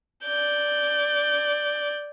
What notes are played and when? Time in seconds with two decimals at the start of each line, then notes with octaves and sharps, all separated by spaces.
0.24 D5 G6